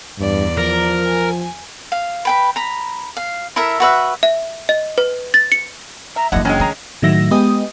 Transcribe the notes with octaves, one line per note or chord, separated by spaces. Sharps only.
E2 G2 D5
F3 A#4
G#5
F5
B4 G5 B5
A#5 B5
F5
E4 A4 A#4 E5
F#4 B4 E5
E5
D#5
B4
A6
C#7
E5 A#5
F#1 D3 E3 E4 D#5 F#5
F#3 G#3 C4 C#4 D#4 G5
D#3 G#4 A#5
A2 D#3 F#3 E5 A#6
G#3 B3 G4 D#5 D#6